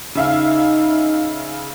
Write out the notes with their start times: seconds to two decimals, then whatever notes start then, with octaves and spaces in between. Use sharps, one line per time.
0.15 C#3 D#4 E5 F5